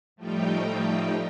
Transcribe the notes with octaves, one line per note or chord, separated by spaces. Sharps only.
A2 F3 G3 A3 D#4 G5